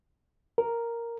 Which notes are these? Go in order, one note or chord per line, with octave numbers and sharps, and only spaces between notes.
A#4